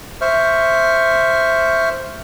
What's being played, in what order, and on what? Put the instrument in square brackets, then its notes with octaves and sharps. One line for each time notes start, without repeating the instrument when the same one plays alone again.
[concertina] C5 E5 C#6 F6